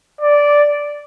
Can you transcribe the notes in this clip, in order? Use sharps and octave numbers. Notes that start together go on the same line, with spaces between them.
D5